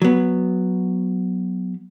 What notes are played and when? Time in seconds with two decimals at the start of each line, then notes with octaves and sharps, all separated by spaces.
0.02 F#3 B3